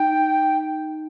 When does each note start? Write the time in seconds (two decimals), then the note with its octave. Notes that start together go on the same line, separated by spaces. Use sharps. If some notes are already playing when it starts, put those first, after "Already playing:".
Already playing: D#4 G5